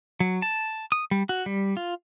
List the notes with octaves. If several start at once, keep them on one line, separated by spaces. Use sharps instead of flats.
F#3
A5
D#6
G3
F#4
G3
F4